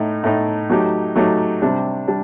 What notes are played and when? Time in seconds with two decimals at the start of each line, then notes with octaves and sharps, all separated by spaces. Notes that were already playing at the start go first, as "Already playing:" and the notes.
Already playing: A2 A3 D#4
0.24 A2 A3 D#4
0.69 F#3 A3 D#4 G4
1.16 F#3 A3 D#4 G4
1.62 C3 G3 D4
2.08 G3 D4